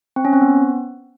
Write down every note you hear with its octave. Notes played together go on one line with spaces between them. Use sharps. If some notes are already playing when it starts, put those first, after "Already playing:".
C4
C#4
C4
B3